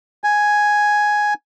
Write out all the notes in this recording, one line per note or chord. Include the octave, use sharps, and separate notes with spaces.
G#5